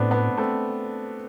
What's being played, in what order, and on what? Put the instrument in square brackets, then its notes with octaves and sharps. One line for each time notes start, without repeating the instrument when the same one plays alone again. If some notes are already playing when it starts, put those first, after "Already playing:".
Already playing: [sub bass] A2 [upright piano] A3 B3 C4 D4
[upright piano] B3 D4
A3 C4